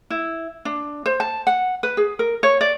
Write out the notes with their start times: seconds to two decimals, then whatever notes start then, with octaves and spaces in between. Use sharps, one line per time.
0.10 E4
0.65 D4
1.06 C5
1.20 A5
1.47 F#5
1.83 B4
1.97 G#4
2.19 A#4
2.43 C#5
2.61 D5